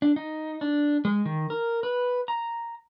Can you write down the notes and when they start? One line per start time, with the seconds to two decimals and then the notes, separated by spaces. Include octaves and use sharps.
0.02 D4
0.16 D#4
0.61 D4
1.05 G#3
1.25 D#3
1.50 A#4
1.83 B4
2.28 A#5